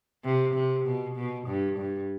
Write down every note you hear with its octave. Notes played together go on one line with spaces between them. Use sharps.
C3
C3
B2
B2
G2
G2